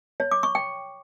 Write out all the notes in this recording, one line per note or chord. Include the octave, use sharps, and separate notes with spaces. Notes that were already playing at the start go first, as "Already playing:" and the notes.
C#5
D6
C#6
G5